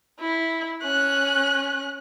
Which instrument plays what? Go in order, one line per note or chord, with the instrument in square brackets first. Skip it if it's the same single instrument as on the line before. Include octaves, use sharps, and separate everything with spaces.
[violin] E4
C#4 F#6